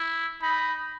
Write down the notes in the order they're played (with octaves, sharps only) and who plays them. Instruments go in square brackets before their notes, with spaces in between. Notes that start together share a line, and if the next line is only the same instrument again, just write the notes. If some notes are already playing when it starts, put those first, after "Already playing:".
Already playing: [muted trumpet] E4
[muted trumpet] D#4 [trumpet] B5